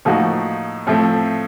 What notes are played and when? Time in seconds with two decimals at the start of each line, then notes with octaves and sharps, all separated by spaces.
0.05 A2 F3 A#3 D#4 F#4
0.87 A2 F3 A3 C4